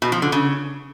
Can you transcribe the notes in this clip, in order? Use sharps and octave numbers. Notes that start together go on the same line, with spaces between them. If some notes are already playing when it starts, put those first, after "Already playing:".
B2
F3
D3
C#3